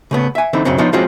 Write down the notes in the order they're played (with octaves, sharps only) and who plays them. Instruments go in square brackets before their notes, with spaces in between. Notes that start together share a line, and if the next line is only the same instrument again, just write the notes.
[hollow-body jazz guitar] C#3 A3 B3
E5 G#5
D3 E3 C4 D#4
B1 F#2 C#3 F#3 C4
F3 B3 D4 D#4 F4 C#5
F3 G#3 C4 C#4 F4 F#4